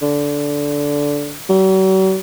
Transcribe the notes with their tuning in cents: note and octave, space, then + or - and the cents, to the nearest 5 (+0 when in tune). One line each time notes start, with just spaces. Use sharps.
D3 -15
F#3 +45